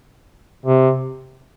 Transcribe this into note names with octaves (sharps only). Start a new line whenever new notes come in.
C3